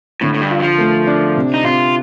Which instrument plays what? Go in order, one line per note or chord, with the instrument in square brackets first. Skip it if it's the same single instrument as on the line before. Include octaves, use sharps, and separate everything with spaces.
[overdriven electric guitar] A2 [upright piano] D3
[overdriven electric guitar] A2
G2
[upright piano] F4
[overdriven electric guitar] F3
[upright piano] A3
D4
C3
[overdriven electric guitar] D#4
[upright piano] C3 [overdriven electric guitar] F4